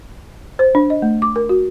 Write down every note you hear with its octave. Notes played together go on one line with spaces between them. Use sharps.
C5
D4
D#5
A3
D6
A#4
F#4